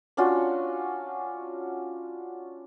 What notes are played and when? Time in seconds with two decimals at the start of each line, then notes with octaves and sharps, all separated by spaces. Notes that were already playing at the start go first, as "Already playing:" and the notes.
0.17 C#4 D4 F4 F#4